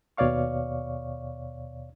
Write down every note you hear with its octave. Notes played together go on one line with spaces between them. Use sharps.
D#2 B2 C#5 D5 F5 C#6